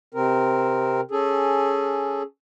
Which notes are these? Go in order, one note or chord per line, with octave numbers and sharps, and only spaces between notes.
C3 C4 A#4
C#4 G#4 A4